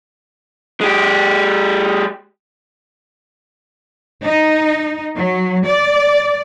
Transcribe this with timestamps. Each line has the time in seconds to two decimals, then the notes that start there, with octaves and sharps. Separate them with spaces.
0.81 G#3 G4
4.24 D#4
5.17 F#3
5.66 D5